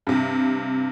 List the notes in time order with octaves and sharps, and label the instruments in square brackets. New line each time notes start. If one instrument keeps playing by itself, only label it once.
[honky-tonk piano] G2 C3